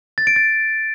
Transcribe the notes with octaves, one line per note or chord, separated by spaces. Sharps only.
A6
D7
A6